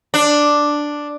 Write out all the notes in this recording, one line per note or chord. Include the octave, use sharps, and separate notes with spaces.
D4